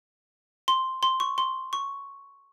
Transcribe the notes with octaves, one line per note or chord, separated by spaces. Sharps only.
C6
C6
C#6
C6
C#6